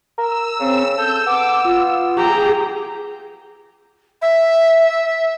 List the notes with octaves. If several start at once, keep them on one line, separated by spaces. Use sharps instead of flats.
A#4 E6
C#3 C4
A4 G6
B3 D6
F4
G4 G#4 A#5
E5